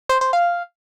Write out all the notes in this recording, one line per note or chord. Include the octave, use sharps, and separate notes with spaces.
C5
C5
F5